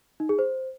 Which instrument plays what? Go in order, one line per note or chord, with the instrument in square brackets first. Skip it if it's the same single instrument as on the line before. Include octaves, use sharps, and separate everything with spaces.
[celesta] D#4
G#4
C5